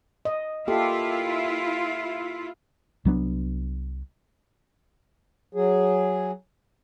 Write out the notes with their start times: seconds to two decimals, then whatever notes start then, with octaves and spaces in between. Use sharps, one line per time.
0.25 D#5
0.68 A#3 E4 F4 G4 A4
3.05 C2 F#3 B3 D4
5.55 F#3 G#4